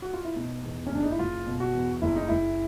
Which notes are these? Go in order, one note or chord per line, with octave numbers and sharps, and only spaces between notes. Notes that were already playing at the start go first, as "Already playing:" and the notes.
F#4
F4
E4
B2 D#4
E2
C#4
F#1 D4
D#4
E4
F#1 F4
B2
F#4
E2
F#1 E4
D#4
F#1 E4